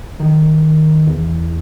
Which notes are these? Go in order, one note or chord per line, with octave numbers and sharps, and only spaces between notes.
D#3
E2